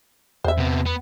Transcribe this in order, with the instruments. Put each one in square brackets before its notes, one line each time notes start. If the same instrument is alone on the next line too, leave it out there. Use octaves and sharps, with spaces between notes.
[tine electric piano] E2 [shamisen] C5 E5
[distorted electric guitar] C3 B3
B3